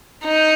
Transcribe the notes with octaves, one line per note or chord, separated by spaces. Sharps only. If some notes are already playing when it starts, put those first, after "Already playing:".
D#4